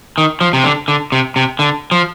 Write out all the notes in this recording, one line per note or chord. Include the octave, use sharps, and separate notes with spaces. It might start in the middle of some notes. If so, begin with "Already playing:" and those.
D#3
F3
C3
D3
D3
C3
C3
D3
F3